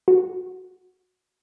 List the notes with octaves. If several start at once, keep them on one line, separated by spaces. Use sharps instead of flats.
F#4